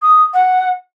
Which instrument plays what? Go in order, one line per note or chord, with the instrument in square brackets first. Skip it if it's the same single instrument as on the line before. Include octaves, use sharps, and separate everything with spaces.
[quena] D#6
F#5